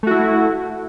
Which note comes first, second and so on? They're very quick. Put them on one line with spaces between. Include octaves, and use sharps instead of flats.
A3 F#4 E4